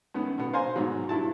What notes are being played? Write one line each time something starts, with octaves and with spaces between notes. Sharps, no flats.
F#2 D#3 B3
B2 B3
C5 F5 G#5 A#5 C6
G#2 B2 D#3 F#3
G2 E4 A5